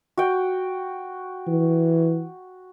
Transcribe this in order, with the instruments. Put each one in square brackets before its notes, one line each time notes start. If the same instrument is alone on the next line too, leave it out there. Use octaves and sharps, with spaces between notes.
[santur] F#4 G5
[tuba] E3